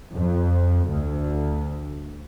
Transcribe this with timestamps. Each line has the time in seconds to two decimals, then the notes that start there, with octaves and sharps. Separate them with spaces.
0.12 F2
0.89 D2